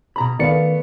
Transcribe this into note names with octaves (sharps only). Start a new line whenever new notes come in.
B2 A#5 B5
D#3 A3 B3 D5 F5 C#7